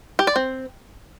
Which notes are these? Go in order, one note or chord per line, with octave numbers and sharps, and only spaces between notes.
G4
D5
C4